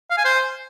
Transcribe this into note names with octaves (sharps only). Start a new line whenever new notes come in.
F5
G#5
C5